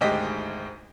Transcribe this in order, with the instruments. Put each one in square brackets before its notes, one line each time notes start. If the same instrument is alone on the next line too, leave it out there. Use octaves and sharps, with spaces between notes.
[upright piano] G#1 D2 G#3 G4 D#5 B6